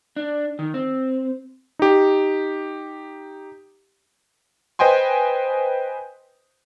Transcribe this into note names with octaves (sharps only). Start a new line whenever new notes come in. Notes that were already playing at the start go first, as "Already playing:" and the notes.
D4
D#3
C4
D#4 G4
B4 C5 D#5 G5 G#5 C6